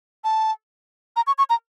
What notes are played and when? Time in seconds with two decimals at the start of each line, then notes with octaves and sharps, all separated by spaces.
0.24 A5
1.16 A#5
1.27 C#6
1.38 C#6
1.50 A#5